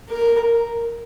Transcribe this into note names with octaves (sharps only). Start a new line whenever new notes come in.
A#4